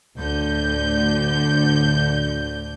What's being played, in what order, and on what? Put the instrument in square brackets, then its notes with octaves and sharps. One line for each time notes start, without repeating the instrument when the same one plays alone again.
[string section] D2 A2 D3 G6